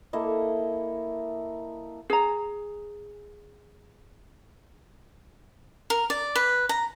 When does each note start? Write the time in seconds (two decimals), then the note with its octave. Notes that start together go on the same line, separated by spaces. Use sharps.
0.13 A#3 E4 A4 D#5
2.10 G#4 A#5
5.90 A#4
6.10 D5
6.36 B4
6.69 A#5